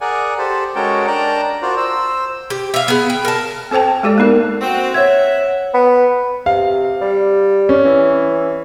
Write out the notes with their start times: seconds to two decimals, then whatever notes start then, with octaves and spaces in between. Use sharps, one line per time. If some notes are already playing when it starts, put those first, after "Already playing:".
0.01 G#4 A#4 D5 F#5 G#5
0.38 G4 A4 C5
0.75 G#3 C#4 F#4 A4 A#4 G5
1.07 D4 A#4 D5 G5 A5 A#5
1.62 F4 F#4 A#4 C5 D5
1.77 C5 E6
2.50 G4
2.74 E5 F5
2.88 B3 G#4
3.10 G5
3.25 A#4 A5
3.71 C4 A4 C5 G5 A5
4.03 G#3 G4 A4 D5
4.18 A#3 B3 D#4 A#4
4.61 C4 F#4
4.94 C#5 E5 F#5 G#6
5.74 B3
6.46 C3 F5
7.02 G3
7.69 C#4
7.85 E3